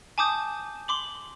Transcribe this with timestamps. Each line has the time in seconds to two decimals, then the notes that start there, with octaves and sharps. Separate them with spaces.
0.18 G#5 A5 D6 D#6 G6
0.88 C6 D6 F#7